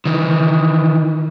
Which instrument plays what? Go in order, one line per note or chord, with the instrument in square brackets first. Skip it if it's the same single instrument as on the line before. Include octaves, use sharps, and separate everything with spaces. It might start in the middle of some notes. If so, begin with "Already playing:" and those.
[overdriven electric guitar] D#3 E3